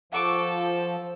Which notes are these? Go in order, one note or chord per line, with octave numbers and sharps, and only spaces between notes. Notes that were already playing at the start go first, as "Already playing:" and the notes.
F3 A4 F#5 C#6 D6